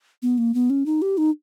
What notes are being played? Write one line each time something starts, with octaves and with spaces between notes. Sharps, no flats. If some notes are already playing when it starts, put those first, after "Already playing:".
B3
A#3
B3
C#4
D#4
G4
D#4